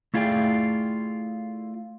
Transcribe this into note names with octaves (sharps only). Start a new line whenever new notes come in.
A3 E4 F4 G#4 D5 G5